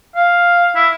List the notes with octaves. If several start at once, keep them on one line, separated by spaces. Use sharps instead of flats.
F5
E4